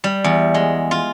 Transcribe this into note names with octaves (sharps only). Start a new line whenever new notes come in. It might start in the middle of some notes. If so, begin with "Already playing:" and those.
G3
E2
G#3
F4